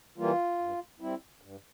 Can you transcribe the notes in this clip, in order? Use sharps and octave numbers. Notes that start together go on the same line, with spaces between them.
E3 G3 A#3 F4
G2
G3 C4 E4
G2